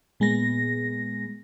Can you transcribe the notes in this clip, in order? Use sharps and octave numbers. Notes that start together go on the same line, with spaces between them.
A#2 G#3 B3 A#6